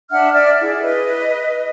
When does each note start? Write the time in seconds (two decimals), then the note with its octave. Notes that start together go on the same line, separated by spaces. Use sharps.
0.10 D4 E5 F#5 F6
0.33 D5 E5 F6
0.61 E4 G#4
0.82 B4 D#5